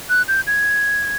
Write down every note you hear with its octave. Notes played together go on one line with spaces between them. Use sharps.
F#6
G6
G#6